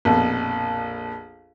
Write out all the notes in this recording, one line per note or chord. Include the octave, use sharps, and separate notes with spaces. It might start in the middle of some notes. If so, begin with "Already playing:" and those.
A#1 F2 B2